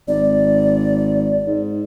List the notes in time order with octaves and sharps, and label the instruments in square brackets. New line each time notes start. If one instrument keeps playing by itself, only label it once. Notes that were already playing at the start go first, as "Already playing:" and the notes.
[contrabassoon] G#1 [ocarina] D5
[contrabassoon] G#2